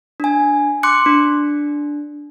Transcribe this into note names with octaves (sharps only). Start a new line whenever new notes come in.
D4 G#5
C6 D6 F#6 C#7
D4